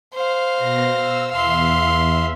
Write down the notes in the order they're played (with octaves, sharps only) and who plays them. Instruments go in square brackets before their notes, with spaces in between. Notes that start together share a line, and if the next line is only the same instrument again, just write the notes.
[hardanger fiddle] C5 F5
[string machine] B2 A#6
E6
[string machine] E2 E5 [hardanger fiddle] F5 C6